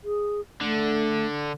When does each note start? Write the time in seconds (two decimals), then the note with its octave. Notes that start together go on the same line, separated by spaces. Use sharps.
0.04 G#4
0.61 D3 A3